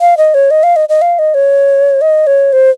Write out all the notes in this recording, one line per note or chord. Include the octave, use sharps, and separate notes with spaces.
F5
D#5
C#5
D#5
F5
D#5
D#5
F5
D#5
C#5
D#5
C#5
C5